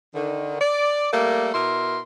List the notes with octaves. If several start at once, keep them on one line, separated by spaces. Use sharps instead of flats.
D3 D#3
D5
G3 A3 A#3
B2 E4 A#4 C6